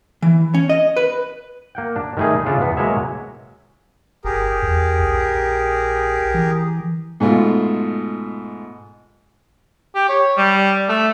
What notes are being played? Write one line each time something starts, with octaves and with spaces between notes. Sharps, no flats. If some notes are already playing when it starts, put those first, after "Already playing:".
E3
C#4
D#5
B4
A#3 F#5 G5
D4
D#3 G3 A3 D#4 G#4
C#3 D4 F4 A4 E5
E2 B3
B2 F#3 G#3 A#3 C#5 E5
G1 G4 G#4 A#4
E2
A#1
E3
G#2 B2 A3 F4
G4
C#5
G3
A3